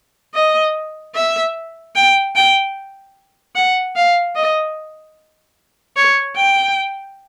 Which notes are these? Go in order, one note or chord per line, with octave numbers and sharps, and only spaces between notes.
D#5
E5
G5
G5
F#5
F5
D#5
C#5
G5